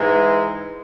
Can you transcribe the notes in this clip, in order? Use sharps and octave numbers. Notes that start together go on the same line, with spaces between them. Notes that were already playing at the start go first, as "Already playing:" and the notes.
Already playing: G#2 E3 G#3